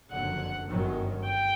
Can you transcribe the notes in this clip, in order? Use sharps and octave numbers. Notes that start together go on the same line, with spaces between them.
F#1 F2 D3 F#3 F#5
G1 F#2 D#3 F#3
G5